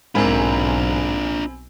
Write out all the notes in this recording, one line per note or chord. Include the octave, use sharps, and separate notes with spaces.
B1 G#2 C4 D4 F4 A#4 G#5 B5